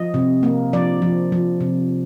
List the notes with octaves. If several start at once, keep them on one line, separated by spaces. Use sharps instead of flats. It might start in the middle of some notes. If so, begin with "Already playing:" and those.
Already playing: F3 D#5
C3
A#3
F3 D5
F3
F3
C3